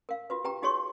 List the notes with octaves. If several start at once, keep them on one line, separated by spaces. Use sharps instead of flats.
A#4 F5
F4 F#4 B4
G4 B4 G5 A#5
D#4 F#4 G#4 C#5 C6 C#6